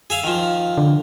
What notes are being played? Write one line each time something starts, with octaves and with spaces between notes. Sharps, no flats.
G#4 E5 F5
D#3 F3
D3